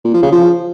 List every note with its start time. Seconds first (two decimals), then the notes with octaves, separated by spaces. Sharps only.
0.05 A#2
0.14 F3
0.23 C#3
0.32 F3